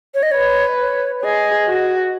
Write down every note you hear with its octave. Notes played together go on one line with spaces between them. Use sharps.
C#5
D#5
B4 C#5
C#5
C#5
G#4 D#5
F#4